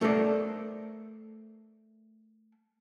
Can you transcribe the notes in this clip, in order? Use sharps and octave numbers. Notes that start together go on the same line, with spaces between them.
A3 A4 A#4 C5 D5